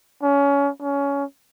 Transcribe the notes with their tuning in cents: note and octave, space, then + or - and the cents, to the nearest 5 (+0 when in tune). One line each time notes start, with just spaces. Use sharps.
C#4 +25
C#4 +20